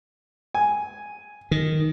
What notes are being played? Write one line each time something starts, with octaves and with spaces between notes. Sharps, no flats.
G#5
D#3